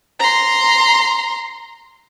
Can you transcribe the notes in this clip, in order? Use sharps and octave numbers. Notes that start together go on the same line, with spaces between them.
A#5 C6